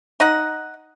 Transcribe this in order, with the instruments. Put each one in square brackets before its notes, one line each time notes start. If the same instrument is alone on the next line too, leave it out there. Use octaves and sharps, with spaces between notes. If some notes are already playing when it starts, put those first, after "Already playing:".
[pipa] D#4 D#5 F#5